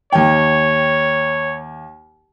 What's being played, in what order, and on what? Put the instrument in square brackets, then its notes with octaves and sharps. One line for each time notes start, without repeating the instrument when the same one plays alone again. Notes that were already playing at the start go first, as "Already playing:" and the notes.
[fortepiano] D#2 G5 [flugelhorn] C#5